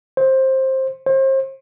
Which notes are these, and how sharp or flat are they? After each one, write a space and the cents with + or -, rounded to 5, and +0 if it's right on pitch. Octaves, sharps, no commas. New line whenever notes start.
C5 +15
C5 +35